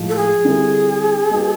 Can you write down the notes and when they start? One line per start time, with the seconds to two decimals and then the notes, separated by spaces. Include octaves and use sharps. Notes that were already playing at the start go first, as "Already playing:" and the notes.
Already playing: A2 F3 G#3
0.09 A4
0.16 G#4
0.45 D3 G3 C4 E4 A4
1.29 G3 A#3 D#4 F#4 B4